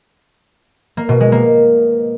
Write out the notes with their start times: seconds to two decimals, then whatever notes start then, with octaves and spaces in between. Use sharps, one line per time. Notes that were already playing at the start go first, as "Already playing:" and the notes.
0.97 A#3
1.09 B2
1.20 G#3
1.32 A#3